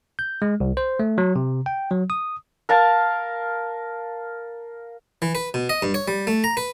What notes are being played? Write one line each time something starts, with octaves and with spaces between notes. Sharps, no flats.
G6
G#3
C2
C5
A3
F#3
C3
G5
F#3
D#6
A#4 F5 A5
E3
B4
B2
D#5
G2
C#5
G3
A3
A#5
B4